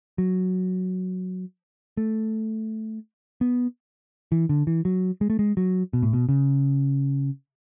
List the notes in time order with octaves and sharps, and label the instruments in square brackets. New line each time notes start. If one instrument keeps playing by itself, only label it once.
[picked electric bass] F#3
A3
B3
E3
D3
E3
F#3
G#3
A3
G#3
F#3
B2
A2
B2
C#3